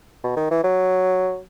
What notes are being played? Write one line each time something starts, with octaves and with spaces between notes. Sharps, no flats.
B2
D#3
E3
F#3